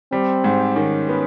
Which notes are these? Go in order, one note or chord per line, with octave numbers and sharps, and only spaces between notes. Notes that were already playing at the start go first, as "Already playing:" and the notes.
G3 C4
G#2
D#3 C#4
B3